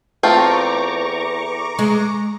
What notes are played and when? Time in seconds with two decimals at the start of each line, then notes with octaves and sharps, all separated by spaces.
0.23 E2 A3 C4 F4 A#5 C#6 D6
1.79 G#3